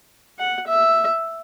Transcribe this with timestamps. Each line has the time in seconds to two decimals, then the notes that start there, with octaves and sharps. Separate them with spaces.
0.39 F#5
0.67 E5